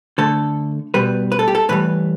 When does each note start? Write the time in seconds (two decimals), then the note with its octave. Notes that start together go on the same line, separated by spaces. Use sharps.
0.18 D3 A3 A4
0.94 B2 G3 B4
1.32 B4
1.39 A4
1.48 G4
1.55 A4
1.69 A2 E3 G3 B4